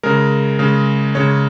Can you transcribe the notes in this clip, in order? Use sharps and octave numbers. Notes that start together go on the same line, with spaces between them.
C#3 G#3 A#4
C#3 G#3
C#3 G#3 C#5